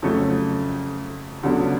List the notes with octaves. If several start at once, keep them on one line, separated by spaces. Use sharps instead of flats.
F2 C#3 F#3 A3
D2 C#3 F#3 B3 D4